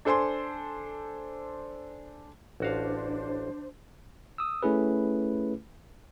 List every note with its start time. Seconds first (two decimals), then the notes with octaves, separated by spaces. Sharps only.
0.05 D4 A4 C5 G#5 C6
2.60 A1 D4 F#4 C5 F5
4.38 D#6 E6
4.63 A3 C#4 E4 G#4 B4